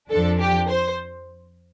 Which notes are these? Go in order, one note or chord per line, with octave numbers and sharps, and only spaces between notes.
F2 F3 D4 A4
G4
C5